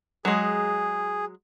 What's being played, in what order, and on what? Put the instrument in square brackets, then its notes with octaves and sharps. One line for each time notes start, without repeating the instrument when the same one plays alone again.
[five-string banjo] F#3 G#3 [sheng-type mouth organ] G#4